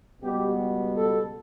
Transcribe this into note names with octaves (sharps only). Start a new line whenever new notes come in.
C#2 B2 G3 B3 G4
A4